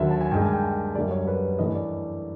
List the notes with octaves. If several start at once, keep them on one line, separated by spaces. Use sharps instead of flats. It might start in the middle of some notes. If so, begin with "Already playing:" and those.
Already playing: D#2 D3 F#3 E5
A5
G#5
G2 D#3 G#3 G5
G#5
G5
G5
F#2 D3 G3 D5
C#5
B4
G2 E3 A3 D#5
D5